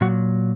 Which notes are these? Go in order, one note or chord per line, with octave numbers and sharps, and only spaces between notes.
A#2 F#3 F#4